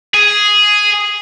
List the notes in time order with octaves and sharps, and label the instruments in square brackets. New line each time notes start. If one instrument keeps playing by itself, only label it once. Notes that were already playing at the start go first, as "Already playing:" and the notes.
[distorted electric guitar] G#4